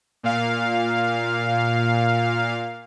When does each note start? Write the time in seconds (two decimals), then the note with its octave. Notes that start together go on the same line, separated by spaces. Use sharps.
0.23 A#2 F5